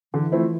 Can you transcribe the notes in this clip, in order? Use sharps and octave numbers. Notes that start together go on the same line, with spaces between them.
D3 E3
F3 A3 C4 E4